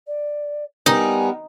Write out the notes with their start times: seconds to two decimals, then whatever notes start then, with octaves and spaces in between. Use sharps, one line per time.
0.07 D5
0.86 G3 B3 D#4 A#4 G#5